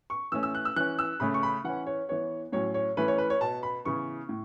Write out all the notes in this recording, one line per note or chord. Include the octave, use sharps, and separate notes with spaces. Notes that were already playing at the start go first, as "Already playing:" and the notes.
C#6
E3 A3 C#4 E6
E6
F#6
E6
E3 C#4 F#6
E6
C#3 A3 C#4 B5
C#6
B5
E3 C#4 F#5
C#5
E3 B3 C#5
A2 F#3 C#4 C#5
C#5
E3 A3 C#4 B4
C#5
B4
C#5
B2 B3 A5
B5
C#3 E3 B3 C#6
A2